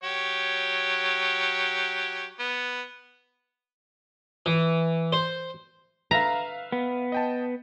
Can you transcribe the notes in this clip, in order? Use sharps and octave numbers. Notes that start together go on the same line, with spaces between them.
F#3 G4 C#5
B3
E3
C5
B4 E5 F5 A#5
B3
D#5 G5 A5